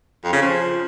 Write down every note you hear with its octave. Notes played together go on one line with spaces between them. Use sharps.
F2
C#3
F3